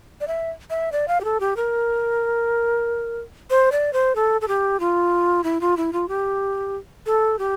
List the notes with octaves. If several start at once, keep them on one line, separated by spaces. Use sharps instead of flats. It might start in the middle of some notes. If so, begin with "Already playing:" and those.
D5
E5
E5
D5
F5
G4
A4
G4
A#4
C5
D5
C5
A4
A4
G4
F4
E4
F4
E4
F4
G4
A4
G4